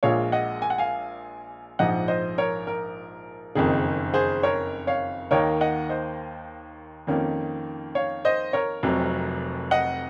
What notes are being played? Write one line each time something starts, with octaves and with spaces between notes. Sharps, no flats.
A#1 A#2 G#3 C#5 F5
D#5 F#5
G#5
F#5
F5 G#5
A#1 G#2 F3 D#5 F#5
C5 D#5
A#4 C#5
A#4
F#1 F2 D#3 G#4
G#4 C5
A#4 C#5
C#5 F5
D#2 D#3 A#3 D#4 A#4 C#5
D#5 F#5
C5 D#5
F2 D#3 A#3 C#4
C#5 F5
C5 D#5
A#4 C#5
F1 F2 C3 F#3
D#5 F#5